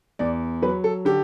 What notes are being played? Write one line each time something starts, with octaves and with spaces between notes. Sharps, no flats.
E2 D5
F#3 B4
A4
D3 G4